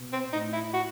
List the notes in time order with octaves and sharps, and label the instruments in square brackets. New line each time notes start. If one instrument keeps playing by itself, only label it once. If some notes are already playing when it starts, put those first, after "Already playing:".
Already playing: [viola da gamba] B2
[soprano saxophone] C4
[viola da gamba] A2 [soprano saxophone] D#4
[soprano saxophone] E4
F#4